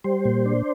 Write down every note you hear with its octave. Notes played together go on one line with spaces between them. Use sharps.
G3 C5
A#2
D4